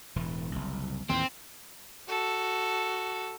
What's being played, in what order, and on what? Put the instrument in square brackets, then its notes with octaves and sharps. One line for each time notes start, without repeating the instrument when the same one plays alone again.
[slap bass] E1 A2 E3
F#1 C2
[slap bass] D#2 A2 E3 [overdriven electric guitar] C4
[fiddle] F#4 A4